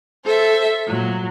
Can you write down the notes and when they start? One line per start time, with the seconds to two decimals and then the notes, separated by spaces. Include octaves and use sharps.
0.25 A4 C5 E5
0.87 A#2 F#3